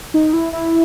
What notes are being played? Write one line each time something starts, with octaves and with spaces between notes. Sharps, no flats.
D#4
E4
E4